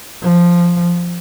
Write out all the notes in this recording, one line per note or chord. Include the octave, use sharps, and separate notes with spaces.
F3